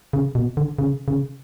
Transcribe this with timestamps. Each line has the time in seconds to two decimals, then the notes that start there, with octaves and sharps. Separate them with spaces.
0.13 C#3
0.35 B2
0.57 D3
0.79 C#3
1.08 C#3